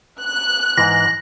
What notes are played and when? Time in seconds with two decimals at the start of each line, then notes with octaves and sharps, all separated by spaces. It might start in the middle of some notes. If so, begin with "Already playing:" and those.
0.21 F#6
0.77 G#2 E3 A#6